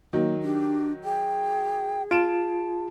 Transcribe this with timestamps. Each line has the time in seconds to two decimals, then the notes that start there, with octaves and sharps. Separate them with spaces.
0.13 D#3 F#3 A#3
0.43 D4 G4
1.04 G#4 G5
2.11 F4 A5 D7 E7